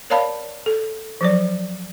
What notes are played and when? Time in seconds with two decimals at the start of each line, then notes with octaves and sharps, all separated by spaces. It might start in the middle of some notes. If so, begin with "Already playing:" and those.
0.10 A#4 C#5 D5 F5 A5 B5
0.66 A4
1.21 F3 F#3 D5